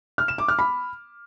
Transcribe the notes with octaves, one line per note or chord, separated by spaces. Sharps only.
F6
E7
D6
F6
B5